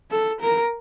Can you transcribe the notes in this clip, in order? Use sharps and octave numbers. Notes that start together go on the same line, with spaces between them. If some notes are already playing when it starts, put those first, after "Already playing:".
A4
A#4